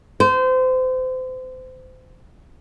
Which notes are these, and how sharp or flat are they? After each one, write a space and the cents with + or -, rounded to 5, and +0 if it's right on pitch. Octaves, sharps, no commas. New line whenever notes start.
C5 -30